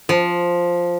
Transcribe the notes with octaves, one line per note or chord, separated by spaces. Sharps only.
F3